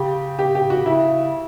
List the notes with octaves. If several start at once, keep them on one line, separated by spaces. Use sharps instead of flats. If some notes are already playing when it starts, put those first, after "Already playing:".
Already playing: C#3 G4
G4
G4
F#4
C#3 E4